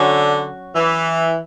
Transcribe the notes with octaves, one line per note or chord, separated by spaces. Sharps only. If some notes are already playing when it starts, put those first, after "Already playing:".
Already playing: D3 F#3 C#4 F#4
E3